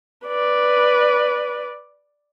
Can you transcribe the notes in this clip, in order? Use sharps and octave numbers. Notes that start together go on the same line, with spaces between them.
B4 D5